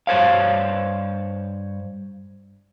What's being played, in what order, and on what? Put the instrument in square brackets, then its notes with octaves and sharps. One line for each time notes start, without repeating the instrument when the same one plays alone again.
[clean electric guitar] G2 C5 C#5 F5